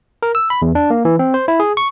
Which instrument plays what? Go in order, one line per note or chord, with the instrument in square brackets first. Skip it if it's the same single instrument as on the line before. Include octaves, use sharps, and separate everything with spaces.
[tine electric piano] A#4
E6
B5
E2
D4
A#3
E3
C4
C5
E4
G#4
C#6